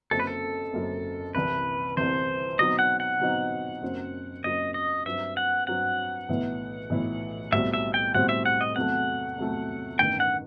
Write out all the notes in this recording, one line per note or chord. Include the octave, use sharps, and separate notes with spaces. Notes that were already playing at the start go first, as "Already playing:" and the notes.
F#1 F#2 F#3 C4 A4
B4
A4
F#1 F#2 F#3 C4
C2 C3 E3 B4
C2 C3 E3 C5
B2 F#3 C4 D#4 D#5
F#5
F#5
B2 F#3 C4 D#4
F#1 F#2 F#3 C4
F#1 F#2 F#3 C4 D#5
D#5
G2 F#3 C4 E5
F#5
G2 F#3 C4 F#5
B1 A2 E3 B3 E4
B1 A2 E3 B3 E4
B1 A2 G3 C4 F#4 E5
E5
G5
B1 A2 G3 C4 F#4 F#5
E5
F#5
D#5
E2 C3 F#3 A3 F#5
E2 C3 F#3 A3
A1 G2 D#3 G5
F#5